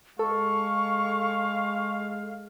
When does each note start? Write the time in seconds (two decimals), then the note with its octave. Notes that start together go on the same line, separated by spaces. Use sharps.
0.19 G#3 A4 F5 C#6